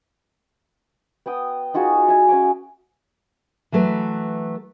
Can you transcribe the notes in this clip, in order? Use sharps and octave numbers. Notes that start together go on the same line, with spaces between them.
B3 G5 D#6
D#4 F4 F#4 G#4
E5 G#5
C#4 G#5 D6
E3 F#3 A3 B4